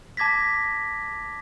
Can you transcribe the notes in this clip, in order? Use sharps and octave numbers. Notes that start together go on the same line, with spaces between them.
A5 D6 G#6 A#6 B6